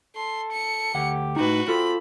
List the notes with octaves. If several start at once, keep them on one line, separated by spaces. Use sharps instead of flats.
A4 C6
C#7
D2 G4 F#5
A2 D#4 F#4 B4
C4 F4 A4 B5